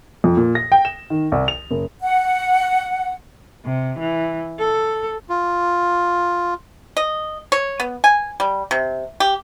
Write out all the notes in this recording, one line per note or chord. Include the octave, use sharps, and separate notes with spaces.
F2
A#2
A#6
G5
E7
D#3
C2
F7
F#1
F#5
C3
E3
A4
F4
D#5
C#5
B3
G#5
G3
C3
G4